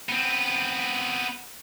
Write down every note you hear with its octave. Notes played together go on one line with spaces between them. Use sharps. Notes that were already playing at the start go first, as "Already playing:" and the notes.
B3 C4